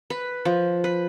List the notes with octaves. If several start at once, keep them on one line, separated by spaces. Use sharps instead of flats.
B4
F3
B4